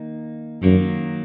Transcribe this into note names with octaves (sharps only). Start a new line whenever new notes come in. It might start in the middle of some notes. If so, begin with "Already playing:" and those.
Already playing: D#3 A#3 D#4
F#2 D#3 F#3 A#3